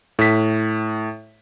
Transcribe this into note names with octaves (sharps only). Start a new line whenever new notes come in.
A2 B6